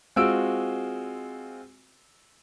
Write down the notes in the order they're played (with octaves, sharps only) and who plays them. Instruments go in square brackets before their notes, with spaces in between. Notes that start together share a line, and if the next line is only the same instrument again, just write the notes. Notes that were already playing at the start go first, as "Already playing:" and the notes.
[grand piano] G#3 C4 F4 F#4 E6 D7